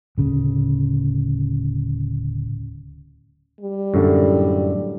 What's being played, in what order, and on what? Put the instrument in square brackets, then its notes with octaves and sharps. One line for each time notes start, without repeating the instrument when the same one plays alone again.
[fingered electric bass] D1 C#3
[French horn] G3
[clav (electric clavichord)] F#2 A2 D3